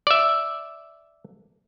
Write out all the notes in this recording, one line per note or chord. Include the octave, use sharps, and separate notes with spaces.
D5 E5